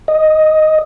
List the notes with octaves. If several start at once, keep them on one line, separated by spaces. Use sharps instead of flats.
D#5